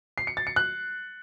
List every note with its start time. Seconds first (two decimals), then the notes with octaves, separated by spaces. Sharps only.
0.18 C7
0.27 C#7
0.37 A6
0.47 C#7
0.56 F#6